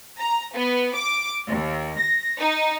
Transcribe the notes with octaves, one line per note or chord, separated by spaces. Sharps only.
A#5
B3
D6
D#2
A#6
D#4